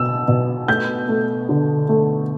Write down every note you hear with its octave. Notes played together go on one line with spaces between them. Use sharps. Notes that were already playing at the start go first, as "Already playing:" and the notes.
Already playing: B2 E6
B2
A3 G6
A3
D3
A3